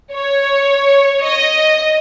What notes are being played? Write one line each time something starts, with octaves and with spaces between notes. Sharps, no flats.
C#5
D#5